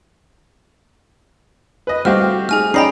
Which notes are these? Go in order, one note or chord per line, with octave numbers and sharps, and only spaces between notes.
B4 D#5
G3 A3 C4 F#4 G4 F5 F6
A3 D#4 G#4 G#5 F6
C#4 D#4 D5 D#5 G5 A#5 B5 C7